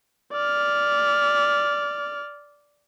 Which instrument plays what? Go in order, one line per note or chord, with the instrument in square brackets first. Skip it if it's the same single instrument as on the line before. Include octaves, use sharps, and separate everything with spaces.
[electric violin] D5 F6